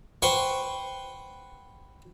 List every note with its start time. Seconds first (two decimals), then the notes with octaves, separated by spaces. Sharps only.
0.22 B4 C5 F#5 G5 C#6